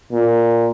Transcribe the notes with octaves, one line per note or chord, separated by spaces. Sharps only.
A#2